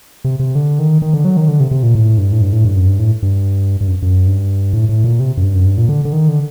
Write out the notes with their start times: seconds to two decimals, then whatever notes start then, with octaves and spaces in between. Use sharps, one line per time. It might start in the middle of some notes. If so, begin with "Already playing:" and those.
0.24 C3
0.39 C3
0.55 D3
0.79 D#3
1.02 D#3
1.13 D3
1.25 F#3
1.37 D#3
1.48 D3
1.60 C3
1.71 C3
1.83 A#2
1.95 A2
2.18 G2
2.33 A2
2.41 G2
2.53 A2
2.65 G2
2.76 F#2
2.87 G2
2.99 A2
3.22 G2
3.81 G2
3.88 F#2
4.02 F#2
4.27 G2
4.73 A2
4.89 A2
5.04 A#2
5.20 C3
5.37 F#2
5.43 G2
5.55 F#2
5.66 G2
5.78 A#2
5.89 D3
6.05 D3
6.13 D#3
6.28 D3